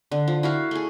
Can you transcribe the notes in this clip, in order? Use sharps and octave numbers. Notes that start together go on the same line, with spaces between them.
D3
F3
E4 F#4 F5
A3 G#4